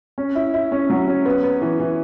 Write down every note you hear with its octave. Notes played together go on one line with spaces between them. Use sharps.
C#4
E4
E4
C#4
F#3
C#4
B3
B3
E3
E3